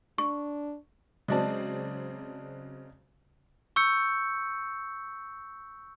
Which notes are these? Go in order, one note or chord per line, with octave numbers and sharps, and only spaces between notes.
D4 C#6
C#3 F#3 G#3 C4 D5 A5
C#6 E6 G6 C#7